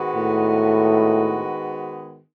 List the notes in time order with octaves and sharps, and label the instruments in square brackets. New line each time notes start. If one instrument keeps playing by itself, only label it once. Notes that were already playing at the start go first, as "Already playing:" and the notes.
Already playing: [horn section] G#2 D#3 G#3 B3 F#4
[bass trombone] A2